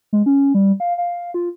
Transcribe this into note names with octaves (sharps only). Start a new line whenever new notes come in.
G#3
C#4
G3
F5
F5
F4